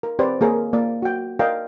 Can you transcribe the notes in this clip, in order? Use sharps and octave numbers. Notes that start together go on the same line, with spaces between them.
A#4
C4 G4 B4 C5 D5
A#3 G#4 A#4 C#5 F5
A#3 D5
F#4 G5
A#4 D5 D#5 F5 G5